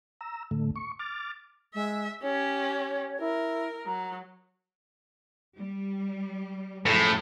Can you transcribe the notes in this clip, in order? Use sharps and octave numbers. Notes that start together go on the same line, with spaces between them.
A#5 E6
A2 D3 A3
C#6
D6 F6 A6
G#3 E5
C#4 G4 C#5
E4 A#4
F#3 A#5
G3
F#2 A2 F3 G#4